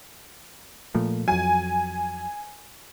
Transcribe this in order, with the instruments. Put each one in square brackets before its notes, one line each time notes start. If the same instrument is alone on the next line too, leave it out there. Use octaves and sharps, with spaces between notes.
[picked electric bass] A#2 F3 A3
[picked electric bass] F2 F#3 [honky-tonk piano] G#5